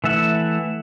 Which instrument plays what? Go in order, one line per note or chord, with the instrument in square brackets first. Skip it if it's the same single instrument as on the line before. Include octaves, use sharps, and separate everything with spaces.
[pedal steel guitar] E3 A3 E5 F#5